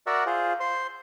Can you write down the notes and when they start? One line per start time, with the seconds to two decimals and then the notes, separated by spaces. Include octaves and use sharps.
0.07 F#4 A#4 D5 E5 F#5
0.26 F4 G#4 C5
0.60 C5 C6